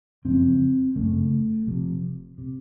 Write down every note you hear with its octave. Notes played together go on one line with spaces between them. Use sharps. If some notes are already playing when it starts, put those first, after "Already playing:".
F#1 F2 C#3 C4
F#1 F2 C#3 A3
F1 F2 C3
C3